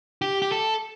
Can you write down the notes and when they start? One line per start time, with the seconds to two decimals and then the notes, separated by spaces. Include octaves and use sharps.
0.22 G4
0.42 G4
0.52 A4